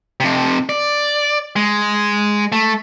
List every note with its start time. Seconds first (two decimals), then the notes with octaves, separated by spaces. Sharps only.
0.20 F2 C3
0.69 D5
1.56 G#3
2.52 A3